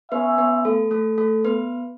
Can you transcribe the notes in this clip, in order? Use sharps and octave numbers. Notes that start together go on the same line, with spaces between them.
B3 C#4 G#4 B4 C#5 E5
B3 B4
A3 A4
A3 A4
A3 A4
B3 B4